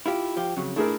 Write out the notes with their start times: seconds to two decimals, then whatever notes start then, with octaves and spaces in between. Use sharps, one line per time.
0.06 E4 F4 G4
0.37 F3 G4
0.57 F2 C#3 F#3
0.76 A3 D4 E4 G#4 A#4